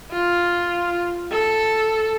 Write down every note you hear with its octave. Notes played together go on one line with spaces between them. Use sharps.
F4
A4